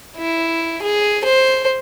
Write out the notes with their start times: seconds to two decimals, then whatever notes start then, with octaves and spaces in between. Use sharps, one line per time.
0.17 E4
0.82 G#4
1.24 C5